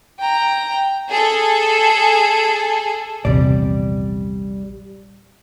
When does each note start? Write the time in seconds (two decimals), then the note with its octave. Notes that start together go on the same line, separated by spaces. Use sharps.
0.19 G5 A#5
1.10 G#4 A4
3.25 A#1 E2 C3 G3 D5